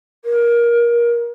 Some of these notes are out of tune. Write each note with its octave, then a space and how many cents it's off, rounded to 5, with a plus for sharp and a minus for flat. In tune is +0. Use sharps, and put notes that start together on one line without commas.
A#4 +20